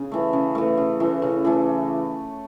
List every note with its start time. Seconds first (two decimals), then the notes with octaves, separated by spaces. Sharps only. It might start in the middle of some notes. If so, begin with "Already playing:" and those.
Already playing: C#3
0.12 E3 A3
0.33 C#3
0.55 E3 A3
0.77 C#3
1.00 E3 A3
1.22 C#3
1.44 E3 A3